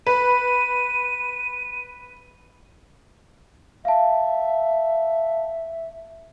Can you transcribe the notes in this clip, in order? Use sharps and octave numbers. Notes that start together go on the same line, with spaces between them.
B4 D#7
E5 F5 A5